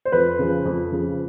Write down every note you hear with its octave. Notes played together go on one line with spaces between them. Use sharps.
C5
F2 B4
C#3 F3
F2
C#3 F3